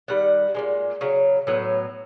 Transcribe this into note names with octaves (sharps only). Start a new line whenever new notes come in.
D#3 G3 F#5
A#2 F3 G#3
C#3 F#3
A2 F#3 B3